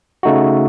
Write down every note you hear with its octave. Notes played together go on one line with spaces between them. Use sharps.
C#3 A3 D#4 F#4